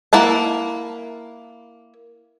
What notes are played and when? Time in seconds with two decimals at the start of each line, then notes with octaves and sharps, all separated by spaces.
0.13 A#3 E4 F#5 A5